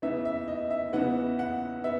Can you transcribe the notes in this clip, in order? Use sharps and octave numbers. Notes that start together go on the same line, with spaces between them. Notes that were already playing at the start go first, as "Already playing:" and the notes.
E2 C#3 E3 B3 E5
E5
D#5
E5
E2 C#3 E3 B3 F#5
F#5
B3 E5